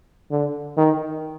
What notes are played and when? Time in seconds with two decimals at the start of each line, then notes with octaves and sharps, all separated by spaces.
0.31 D3
0.77 D#3